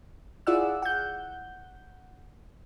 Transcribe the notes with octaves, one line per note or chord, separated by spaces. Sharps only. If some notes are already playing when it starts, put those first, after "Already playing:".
E4 F4 G#4 D5 F#5 E6
F#5 G6